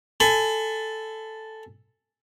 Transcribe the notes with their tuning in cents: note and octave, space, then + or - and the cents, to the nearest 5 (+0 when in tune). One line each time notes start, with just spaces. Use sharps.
A4 +0 G#5 +0 B5 +35